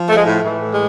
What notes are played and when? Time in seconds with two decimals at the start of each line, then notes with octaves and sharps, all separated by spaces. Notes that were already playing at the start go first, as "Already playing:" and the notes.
Already playing: F3
0.09 A3
0.17 G#3
0.24 A2 A3
0.41 A2 E3
0.73 G#3